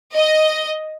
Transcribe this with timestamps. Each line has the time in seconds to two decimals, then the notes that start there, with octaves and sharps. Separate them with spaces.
0.15 D#5